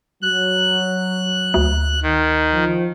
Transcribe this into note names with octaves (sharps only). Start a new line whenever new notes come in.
F#3 F#6
D2
D#3
F3